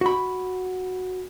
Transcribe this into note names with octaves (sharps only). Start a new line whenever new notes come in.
F#4 B5